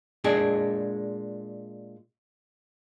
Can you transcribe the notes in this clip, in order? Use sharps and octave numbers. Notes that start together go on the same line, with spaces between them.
A#2 G#3 D4 G#4